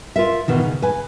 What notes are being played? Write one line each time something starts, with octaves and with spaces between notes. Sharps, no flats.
F4 A#4 E5
B2 D#3 E3
C#3
B4 G#5